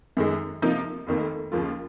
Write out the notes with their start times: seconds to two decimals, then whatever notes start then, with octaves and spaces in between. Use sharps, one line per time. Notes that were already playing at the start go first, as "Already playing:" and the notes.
0.17 F#2 D#3 G#3
0.62 C3 F3 A#3 D#4
1.07 F1 F2 D#3 A#3
1.52 D#2 C#3 F3 A#3 F4